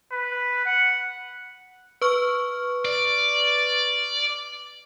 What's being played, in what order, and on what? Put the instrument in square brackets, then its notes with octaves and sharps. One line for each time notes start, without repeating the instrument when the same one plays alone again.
[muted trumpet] B4
F#5
[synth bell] B4 C#6 F6
[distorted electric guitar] D5